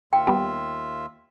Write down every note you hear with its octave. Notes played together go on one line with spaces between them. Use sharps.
D#2 F4 E5 G5
G3 B3 G4